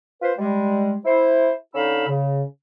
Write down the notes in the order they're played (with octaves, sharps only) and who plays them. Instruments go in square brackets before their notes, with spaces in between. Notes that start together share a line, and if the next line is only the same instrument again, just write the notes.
[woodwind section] F4 B4 C5
G3 G#3
E4 C5
D3 C#4 D#4 F5 B5 E6
C#3